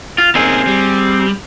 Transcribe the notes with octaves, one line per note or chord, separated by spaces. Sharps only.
F4
A#3 C4 C#4 D#4 G#4
G3